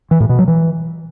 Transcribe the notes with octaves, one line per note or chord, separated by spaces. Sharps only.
E3
A2
B2
F#3
E3